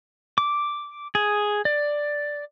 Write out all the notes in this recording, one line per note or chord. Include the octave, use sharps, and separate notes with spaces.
D6
G#4
D5